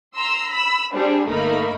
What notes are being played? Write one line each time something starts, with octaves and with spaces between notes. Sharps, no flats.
A#5 C6 E6
B5 E6
G3 C4 D4 G#4
G1 A3 A#3 D#4 A#4 B5